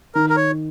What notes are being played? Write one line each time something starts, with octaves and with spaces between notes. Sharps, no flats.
D#3 A#4
A#4
C#5